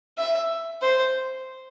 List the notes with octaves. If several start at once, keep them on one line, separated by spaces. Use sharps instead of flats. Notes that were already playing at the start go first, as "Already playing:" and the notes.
E5
C5